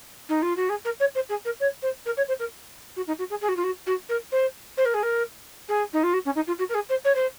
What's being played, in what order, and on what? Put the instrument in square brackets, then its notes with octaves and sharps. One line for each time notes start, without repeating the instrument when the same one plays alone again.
[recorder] D#4
F4
F#4
G#4
A#4
C#5
C5
G#4
A#4
C#5
C5
A#4
C#5
C5
A#4
F#4
D#4
F#4
G#4
G#4
F#4
F4
F#4
F#4
A#4
C5
C5
A#4
G#4
A#4
G#4
D#4
F4
F#4
C#4
D#4
F4
F#4
A#4
G#4
C5
C#5
C5